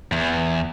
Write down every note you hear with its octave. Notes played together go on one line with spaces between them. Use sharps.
E2